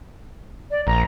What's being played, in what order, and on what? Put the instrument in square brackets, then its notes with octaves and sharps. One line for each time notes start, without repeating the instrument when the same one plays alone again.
[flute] D5
[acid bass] A#1 [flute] A#5